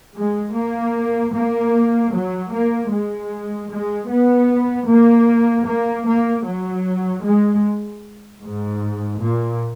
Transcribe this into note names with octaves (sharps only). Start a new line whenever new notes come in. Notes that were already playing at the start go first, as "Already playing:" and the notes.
G#3
A#3
A#3
F#3
A#3
G#3
G#3
B3
A#3
A#3
A#3
F#3
G#3
G#2
A#2